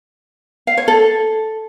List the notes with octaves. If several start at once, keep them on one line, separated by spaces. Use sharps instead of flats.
F5
C#5
A4